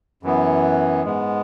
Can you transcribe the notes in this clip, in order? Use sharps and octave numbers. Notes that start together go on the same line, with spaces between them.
F#2 E3 B3
G#2 G#3 B3